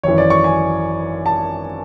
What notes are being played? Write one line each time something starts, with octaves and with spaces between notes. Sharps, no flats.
G#1 F#2 E3 C#5
D5
C#6
G#5
A5